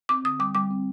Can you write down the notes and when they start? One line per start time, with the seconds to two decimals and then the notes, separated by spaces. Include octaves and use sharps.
0.09 C4 D6
0.24 D3 D#6
0.39 G3 D6
0.55 G3 D6
0.71 C4